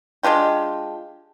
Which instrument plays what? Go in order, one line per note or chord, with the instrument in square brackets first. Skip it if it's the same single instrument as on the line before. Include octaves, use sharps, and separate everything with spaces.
[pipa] G#3 D4 F4 G4